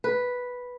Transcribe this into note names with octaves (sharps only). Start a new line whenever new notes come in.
B4